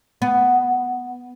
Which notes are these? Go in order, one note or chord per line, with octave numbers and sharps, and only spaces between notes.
B3